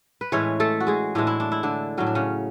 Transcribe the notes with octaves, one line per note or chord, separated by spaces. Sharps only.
B4
A2 E3 G#3 C#4 C#5
A3 A4
F#4
G#3 G#4
A2 E3 G#3 D4
E4
D4
E4
D3 D4
A2 F#3 C#4
D4
C#3 C#4